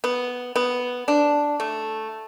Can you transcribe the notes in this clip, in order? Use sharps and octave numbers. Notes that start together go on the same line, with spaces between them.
B3
B3
D4
A3